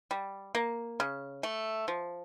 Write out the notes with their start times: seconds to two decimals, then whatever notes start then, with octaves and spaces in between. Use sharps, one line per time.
0.11 G3
0.55 A#3
1.00 C#3
1.43 A3
1.88 F3